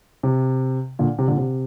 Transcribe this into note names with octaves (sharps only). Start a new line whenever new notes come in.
C3
A#2 D3
C3
A#2 D3
C3